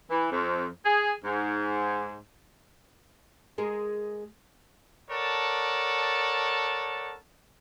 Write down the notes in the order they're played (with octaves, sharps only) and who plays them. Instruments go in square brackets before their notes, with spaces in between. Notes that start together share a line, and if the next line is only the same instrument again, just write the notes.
[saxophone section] E3
F2
G#4
G#2
[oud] G#3 G#4 A#4
[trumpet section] A4 A#4 C#5 D5 F#5 A5